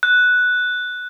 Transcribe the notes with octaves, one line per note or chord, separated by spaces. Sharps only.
F#6